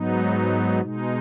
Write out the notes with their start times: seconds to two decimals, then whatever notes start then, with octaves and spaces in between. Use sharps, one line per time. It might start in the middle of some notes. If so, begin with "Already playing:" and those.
Already playing: G#2 F#3 B3 D#4
0.81 B2 G#3 D#4